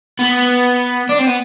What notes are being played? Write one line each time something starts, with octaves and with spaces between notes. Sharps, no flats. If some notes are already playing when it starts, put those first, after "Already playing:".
B3
D4
C4
B3